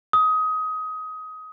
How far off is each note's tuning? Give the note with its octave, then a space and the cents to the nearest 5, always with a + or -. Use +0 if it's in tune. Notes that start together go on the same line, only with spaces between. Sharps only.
D#6 +20